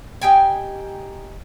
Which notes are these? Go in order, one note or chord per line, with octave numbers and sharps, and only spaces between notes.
D#4 G4 G5 G#5